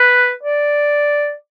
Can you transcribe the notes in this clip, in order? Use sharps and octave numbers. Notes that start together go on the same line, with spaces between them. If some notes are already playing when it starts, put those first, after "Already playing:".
Already playing: B4
D5